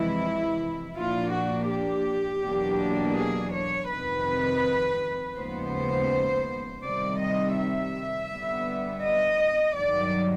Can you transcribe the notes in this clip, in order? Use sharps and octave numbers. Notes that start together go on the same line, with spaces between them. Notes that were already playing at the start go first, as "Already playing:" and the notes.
Already playing: F2 C3 E3 G#3 E4
A#2 F3 A#3 D4 F4
F#4
G4
E2 B2 F#3 A#3 D4
G#4
C#5
F2 C3 D#3 B4
D#2 C#3 F3 G#3 B3 C5
C3 D#3 G3 D5
D#5
E5
D3 G3 B3
D#5
G2 D#3 F#3 D5